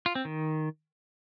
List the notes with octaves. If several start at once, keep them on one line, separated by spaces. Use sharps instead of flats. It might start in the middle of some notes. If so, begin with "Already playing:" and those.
F4
C4
D#3